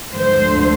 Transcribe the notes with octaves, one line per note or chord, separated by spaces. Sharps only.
D2 D3 F3 C5